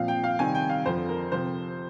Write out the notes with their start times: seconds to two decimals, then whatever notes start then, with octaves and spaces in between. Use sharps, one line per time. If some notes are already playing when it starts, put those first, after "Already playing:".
Already playing: A#2 F3 C4 F5
0.08 G5
0.24 F5
0.39 C3 D#3 G3 C4 G#5
0.55 G5
0.69 F5
0.86 F2 D3 F3 C5
1.09 A#4
1.32 C3 F3 C4 C5